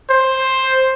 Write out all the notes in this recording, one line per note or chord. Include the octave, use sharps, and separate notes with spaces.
C5